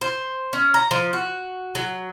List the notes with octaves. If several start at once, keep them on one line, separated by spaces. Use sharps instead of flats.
C5
C#4
A#5
F3
F#4
F#3